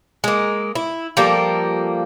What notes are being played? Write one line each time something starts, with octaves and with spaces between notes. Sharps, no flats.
G#3 A#3
E4
F3 G3 A#3 A4